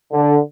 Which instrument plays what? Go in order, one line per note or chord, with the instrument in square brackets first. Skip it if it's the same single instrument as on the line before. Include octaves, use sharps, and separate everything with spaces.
[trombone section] D3